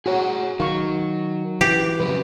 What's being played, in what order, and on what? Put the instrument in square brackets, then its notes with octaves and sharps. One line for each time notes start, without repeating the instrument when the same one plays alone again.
[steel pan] F#4 C#5 [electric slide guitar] G#4 F#5 A#5
[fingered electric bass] D#3 [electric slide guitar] F#3 [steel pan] F5 C#6
[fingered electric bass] E3 [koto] G4
[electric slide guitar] F2 C#3 F#3 [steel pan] B4